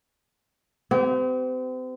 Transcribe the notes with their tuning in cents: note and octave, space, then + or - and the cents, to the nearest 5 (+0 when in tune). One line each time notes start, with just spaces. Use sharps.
C4 -40 G4 -30